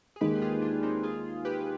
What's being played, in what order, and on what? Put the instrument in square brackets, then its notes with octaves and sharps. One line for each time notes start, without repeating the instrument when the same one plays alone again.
[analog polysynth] G#4
[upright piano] D#2 D#3 G#3 [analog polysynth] G4 B4
[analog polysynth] F4 G#4
D4 F4
C4 D#4
F4 G#4
G4 B4